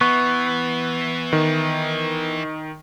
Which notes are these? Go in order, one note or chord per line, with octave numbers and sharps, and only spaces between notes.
E3 B3 C#6
D#3